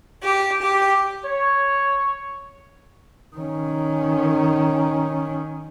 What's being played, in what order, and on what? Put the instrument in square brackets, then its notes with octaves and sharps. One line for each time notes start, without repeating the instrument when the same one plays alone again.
[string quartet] G4
G4
[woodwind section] C#5
[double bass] D#3 C#4